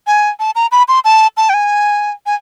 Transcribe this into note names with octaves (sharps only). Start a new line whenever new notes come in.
G#5
A5
A#5
B5
C6
A5
A5
G5
G#5
G#5